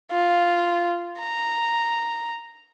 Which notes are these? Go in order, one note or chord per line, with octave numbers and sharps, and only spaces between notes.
F4
A#5